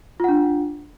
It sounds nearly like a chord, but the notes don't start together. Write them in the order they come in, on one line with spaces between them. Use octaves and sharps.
F4 F#5 D4